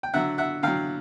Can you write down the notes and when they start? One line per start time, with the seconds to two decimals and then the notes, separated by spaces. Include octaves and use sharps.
0.03 G5
0.14 D3 F#3 E5 F#5
0.38 E5 F#5
0.63 D3 F#3 F5 G5